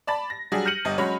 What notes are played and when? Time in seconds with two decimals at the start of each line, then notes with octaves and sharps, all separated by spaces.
0.07 D5 A5 B5 A6
0.30 A#6
0.52 F#3 G3 D4 G#4
0.65 F6 G6 A#6 C#7 D#7 F#7
0.85 G1 D#5
0.98 F#3 G#3 C#4 C#5 B5